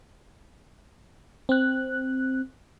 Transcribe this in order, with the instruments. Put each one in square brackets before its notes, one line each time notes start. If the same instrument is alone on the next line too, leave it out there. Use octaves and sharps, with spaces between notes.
[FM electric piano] C4 F#6